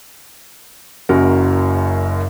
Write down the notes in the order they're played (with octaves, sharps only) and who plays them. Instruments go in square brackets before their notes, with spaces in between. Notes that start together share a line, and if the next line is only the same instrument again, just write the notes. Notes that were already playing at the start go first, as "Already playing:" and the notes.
[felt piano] F#1 F#2 F#4 A#4